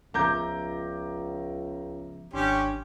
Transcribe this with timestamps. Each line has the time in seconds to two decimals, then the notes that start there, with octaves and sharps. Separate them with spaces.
0.14 C#2 F3 B3 E5 A#5 D6 G6
2.33 G#1 C#4 D4 G4 C6